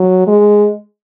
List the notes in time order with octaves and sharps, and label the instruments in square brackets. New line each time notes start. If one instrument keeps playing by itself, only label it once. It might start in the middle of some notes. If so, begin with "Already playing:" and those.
Already playing: [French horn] F#3
G#3